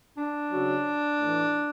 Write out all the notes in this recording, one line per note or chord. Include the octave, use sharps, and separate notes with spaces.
D4
C#3 F#3
A2 E3